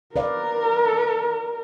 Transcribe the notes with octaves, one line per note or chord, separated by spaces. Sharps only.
A#4 B4 D5 F5